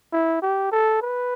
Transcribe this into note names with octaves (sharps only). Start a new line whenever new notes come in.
E4
G4
A4
B4